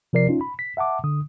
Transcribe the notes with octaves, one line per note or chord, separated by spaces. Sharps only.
C3 F3 A#4 D5 C7
C#4 D#4 F4
B5
B6
E5 F#5 A5 D6
D3 D#6